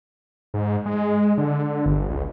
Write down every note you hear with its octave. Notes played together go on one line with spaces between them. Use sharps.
G#2
G#3
D3
G1
C#2